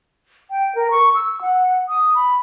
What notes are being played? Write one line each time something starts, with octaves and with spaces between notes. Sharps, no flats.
G5
A#4
C#6
E6
F#5
D#6
B5